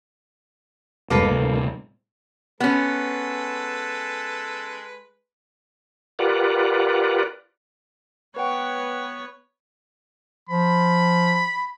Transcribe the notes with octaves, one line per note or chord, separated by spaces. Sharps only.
E1 G2 G#3 A#3 A4 B4
D1 C2
G#3 B3 C#4 A4 B4
F4 G4 A#4 B4 D5 F#5
B3 B4 C#5 F#5 G5
F3 B5